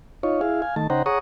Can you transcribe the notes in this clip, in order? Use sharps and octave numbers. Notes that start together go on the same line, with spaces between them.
D#4 F4 C#5
E4 G#4 F5
F5 G#5
D#3 A3 A5
C#3 D#4 C5 F#5 G5 A#5
G#4 C#5 F#5 A#5 C#6 D#6